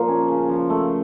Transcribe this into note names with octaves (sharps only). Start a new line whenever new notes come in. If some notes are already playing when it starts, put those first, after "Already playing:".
Already playing: A#2 F3 A#3
C#4
C#3
F3
A3